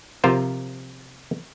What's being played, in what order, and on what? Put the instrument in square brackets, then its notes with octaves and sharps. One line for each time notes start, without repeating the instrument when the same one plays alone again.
[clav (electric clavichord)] C3 F3 F4 A#4 C5